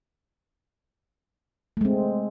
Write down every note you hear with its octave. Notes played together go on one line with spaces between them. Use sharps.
G#3 A3 C4